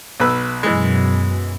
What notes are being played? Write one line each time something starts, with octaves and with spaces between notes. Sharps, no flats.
B1 B4 E6
F#2 B2 E3 G#3